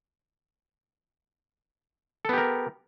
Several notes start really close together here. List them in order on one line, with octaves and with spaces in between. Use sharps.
A4 B3 G4 A#4